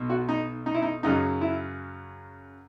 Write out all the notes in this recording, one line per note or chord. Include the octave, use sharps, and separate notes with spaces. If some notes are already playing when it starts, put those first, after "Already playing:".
Already playing: B1 B2
F#4
D#4
D#4
E4
D#4
F#2 C#3 F#3 D#4
E4